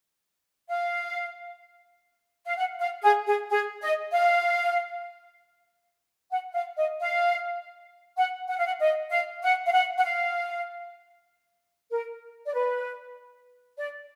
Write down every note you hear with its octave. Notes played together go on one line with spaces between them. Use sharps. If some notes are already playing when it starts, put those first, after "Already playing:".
F5
F5
F#5
F5
G#4
G#4
G#4
D#5
F5
F#5
F5
D#5
F5
F#5
F#5
F5
F#5
D#5
F5
F#5
F5
F#5
F#5
F5
A#4
D5
B4
D5